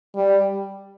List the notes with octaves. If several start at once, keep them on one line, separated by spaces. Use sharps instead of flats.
G3